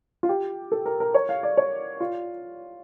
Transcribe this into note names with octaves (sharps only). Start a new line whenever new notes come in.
F4
G4
A4
A#4
A#4
C#5
F5
D5
C#5
F4